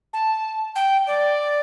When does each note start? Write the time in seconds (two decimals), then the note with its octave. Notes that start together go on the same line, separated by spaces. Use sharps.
0.13 A5
0.75 G5
1.07 D5